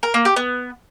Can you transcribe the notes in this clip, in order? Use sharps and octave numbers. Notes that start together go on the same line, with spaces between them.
A#4
A#3
G4
B3